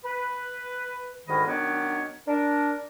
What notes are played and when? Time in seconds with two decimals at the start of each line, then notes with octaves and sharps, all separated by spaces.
0.04 B4
1.28 D2 G#2 D#3 G#3 D#5 B5
1.47 D#3 F#3 B3 C#4 D4
2.27 D4 A#4